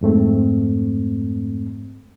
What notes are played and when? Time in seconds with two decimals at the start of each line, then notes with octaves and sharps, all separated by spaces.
0.01 F2 G#2 A3 C4